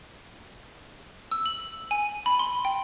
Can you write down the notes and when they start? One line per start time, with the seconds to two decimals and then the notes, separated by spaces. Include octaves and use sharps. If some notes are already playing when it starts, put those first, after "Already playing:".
1.32 E6
1.46 F#7
1.91 G#5
2.26 B5
2.39 C6
2.65 G5